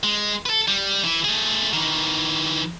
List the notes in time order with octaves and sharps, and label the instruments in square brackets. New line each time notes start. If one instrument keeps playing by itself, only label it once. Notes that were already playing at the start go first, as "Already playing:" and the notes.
[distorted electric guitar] G#3
A4 B4
G3
E3 E4
A3 G#4
D#3 E3